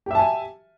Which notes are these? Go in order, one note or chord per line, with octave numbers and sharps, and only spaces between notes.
G4 E5 G#5 A5